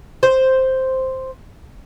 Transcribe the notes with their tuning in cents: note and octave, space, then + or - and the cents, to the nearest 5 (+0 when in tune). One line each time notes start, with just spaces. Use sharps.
C5 +0